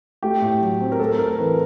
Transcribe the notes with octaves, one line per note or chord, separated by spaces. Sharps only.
A3 G4
A2
F#3
C4
A#4
A3 A4
A2 A#4
E3 B4